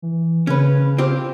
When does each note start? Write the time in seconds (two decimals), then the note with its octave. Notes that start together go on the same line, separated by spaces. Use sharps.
0.02 E3
0.47 C#3 C#4 B4
0.98 C4 F4 G4